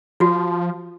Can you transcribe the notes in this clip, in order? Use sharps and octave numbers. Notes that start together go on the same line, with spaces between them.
F3 F4 F#4